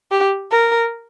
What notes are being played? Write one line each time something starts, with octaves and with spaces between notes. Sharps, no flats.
G4
A#4